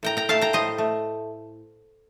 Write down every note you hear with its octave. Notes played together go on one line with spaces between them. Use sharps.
A2 G5 A#5
G5 A#5
A3 F5 A5
G5 A#5
A2 C5 D#5
A3